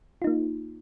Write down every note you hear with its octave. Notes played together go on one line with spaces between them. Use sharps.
A#3 D#4 F4